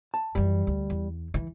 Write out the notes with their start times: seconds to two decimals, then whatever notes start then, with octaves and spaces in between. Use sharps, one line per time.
0.14 A5
0.35 F#2 E3 G3
0.67 D2
0.90 E2
1.34 E3